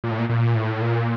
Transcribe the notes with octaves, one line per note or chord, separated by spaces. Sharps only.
A#2
A2
A#2
A#2
A2
A#2